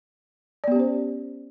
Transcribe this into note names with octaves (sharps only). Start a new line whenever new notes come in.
B3 C#4 G4 C5 D5